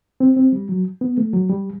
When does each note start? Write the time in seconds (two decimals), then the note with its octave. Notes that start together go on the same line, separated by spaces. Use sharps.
0.20 C4
0.37 C4
0.52 G3
0.69 F#3
1.01 B3
1.18 A3
1.33 F#3
1.49 G3